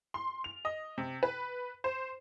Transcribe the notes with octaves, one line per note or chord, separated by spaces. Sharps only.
C6
F7
D#5
C3
B4
C5